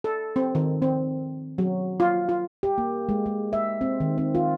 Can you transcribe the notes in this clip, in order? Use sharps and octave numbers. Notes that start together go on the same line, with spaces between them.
A4
C4
D#3
C4
F#3
F4
F4
G4
A#3
G#3
G#3
E5
C4
D#3
C4
F4